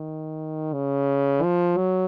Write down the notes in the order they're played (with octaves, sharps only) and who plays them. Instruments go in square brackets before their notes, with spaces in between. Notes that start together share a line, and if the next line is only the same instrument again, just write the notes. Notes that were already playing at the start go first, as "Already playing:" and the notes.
Already playing: [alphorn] D#3
C#3
F3
F#3